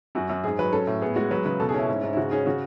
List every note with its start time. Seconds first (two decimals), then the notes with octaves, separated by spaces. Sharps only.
0.15 F#2 F#4
0.29 F#2
0.44 G#2 G#4
0.59 F#3 B4
0.72 C#4 A4
0.87 A2
1.01 B3 G#4
1.16 G#3 F#4
1.31 F#3 B4
1.45 C#3 B4
1.60 B2 A4
1.69 G#4
1.74 C#4 E4
1.88 G#2
2.03 G#2
2.13 E4
2.17 C#3 F#4
2.31 C#4 G#4
2.46 C#3 F#4